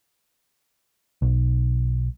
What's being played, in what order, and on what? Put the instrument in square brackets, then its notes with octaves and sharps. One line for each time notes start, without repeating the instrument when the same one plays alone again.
[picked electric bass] B1